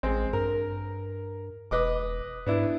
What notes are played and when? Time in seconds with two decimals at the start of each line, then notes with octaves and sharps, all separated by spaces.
0.03 A1 G#3 C4
0.33 G2 A#4
1.71 E1 B4 D#5 D6
2.46 G#2 B3 D4 E4